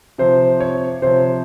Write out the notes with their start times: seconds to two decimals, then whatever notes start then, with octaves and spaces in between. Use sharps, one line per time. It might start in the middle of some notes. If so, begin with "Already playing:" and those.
0.18 C3 F3 C5
0.60 C#5
1.02 C3 F3 C5